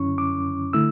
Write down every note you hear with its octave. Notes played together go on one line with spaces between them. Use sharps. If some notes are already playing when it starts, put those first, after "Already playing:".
Already playing: F#2 D3 F#3 C#4 E4 C#6
D6
D3 A3 E4 E6